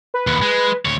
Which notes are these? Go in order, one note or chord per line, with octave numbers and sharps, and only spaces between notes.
B4
D#2 B3
G#3
D2 C#5